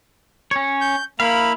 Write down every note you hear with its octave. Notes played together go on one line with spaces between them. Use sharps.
C#4 C#5
G6
A#3 E4 F5 B5